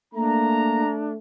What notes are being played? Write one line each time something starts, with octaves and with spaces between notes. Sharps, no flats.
A3 A#3 D4 A#5